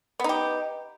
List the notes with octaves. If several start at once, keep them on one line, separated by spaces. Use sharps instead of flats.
B3 D#4 G4